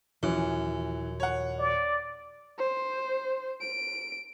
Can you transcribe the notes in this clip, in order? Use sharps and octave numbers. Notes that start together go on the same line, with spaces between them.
D#1 F#2 E3 F3
C#5 F#5
D5
C5
D7